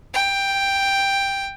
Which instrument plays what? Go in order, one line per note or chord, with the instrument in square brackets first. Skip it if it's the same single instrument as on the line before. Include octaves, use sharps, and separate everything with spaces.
[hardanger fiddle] G5